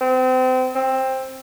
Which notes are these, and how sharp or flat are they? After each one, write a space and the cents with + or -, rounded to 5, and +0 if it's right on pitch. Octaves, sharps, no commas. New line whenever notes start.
C4 -30
C4 +10